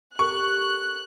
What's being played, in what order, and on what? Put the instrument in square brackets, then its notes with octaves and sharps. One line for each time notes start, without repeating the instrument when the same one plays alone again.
[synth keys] G4 A4 A#4 [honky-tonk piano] C#6 [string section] F#6